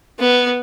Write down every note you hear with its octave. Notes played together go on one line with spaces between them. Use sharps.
B3